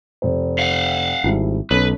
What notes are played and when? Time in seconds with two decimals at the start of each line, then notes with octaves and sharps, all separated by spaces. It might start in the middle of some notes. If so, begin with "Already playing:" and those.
0.22 F1 C5
0.59 F5 F#5
1.24 G#1 G3 C4 E4
1.71 B1 C#4 A4 B4